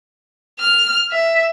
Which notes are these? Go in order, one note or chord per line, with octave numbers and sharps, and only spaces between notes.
F6
E5